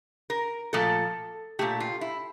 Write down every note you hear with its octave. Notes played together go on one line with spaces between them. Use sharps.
A#4
A#2 F3 A3 A4
A#2 F3 A3 G4
F4
E4